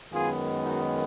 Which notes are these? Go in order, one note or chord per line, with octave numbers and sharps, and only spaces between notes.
F#2 D#3 G#3 B3 F4 G#4
D#4 F#4